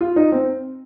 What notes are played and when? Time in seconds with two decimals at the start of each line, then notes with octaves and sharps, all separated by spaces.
0.01 F4
0.16 D#4
0.32 C4